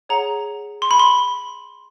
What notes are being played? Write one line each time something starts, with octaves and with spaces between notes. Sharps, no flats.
G#4 C#5 F#5 A#5
C6
B5
C6